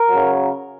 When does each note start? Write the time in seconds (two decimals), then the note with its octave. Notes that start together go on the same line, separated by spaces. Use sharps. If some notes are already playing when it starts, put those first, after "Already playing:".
Already playing: A#4
0.09 C#3 F#3